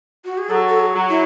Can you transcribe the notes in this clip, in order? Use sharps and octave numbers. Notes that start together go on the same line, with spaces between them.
F#4
G#4
F#3 A4
A4
G#4
F#3
E4